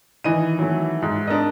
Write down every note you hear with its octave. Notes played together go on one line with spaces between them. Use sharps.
D#3 E3 D#5 D#7
F#3 A3
G#2
D4 A#4 D#5